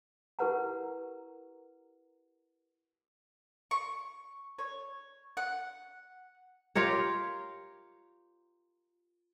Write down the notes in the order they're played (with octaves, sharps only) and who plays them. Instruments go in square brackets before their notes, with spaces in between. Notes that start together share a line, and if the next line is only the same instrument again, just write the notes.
[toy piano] E4 G4 A#4 B4 F#5 A#5
[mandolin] C#6
C#5
F#5
[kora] F4 G4 A#4 C#5